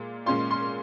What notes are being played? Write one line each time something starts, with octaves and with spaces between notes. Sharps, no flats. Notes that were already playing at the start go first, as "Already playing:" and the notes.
Already playing: A#2 G#3 F4
A#2 G#3 C#4 F4 C6
C6